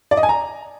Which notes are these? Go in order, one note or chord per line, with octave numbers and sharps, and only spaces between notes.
D5
D#5
G#5
A#5